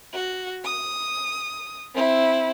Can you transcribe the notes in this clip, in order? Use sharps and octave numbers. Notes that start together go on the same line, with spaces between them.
F#4
D#6
C4 E4